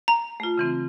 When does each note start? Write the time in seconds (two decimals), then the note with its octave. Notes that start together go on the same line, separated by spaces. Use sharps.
0.08 A#5
0.40 A3 F4
0.58 C#3 E3 C4